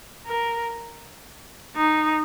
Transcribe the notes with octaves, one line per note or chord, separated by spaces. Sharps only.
A#4
D#4